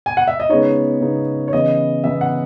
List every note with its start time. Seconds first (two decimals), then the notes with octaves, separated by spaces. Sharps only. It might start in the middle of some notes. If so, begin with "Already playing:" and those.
0.06 G#5
0.17 F#5
0.28 E5
0.40 D#5
0.49 C#3 G#3 B3 D#4 C#5
1.01 C#3 G#3 B3 D#4
1.48 C#5
1.53 C#3 E3 B3 D#5
2.04 C#3 E3 B3 E5
2.21 F#5